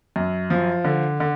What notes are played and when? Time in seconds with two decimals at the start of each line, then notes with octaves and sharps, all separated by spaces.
0.16 F#2
0.50 F3
0.85 D3
1.20 D3